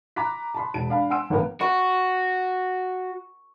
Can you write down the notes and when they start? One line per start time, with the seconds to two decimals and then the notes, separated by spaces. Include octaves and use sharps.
0.16 A#5 B5 D6 F#6 B6
0.55 A5 B5 C6
0.74 E1 A5 D7
0.90 D4 F5 B5
1.10 F#5 G#5 C6 E6 D7
1.30 G1 A2 E3 B3 A#4
1.61 F#4 C#6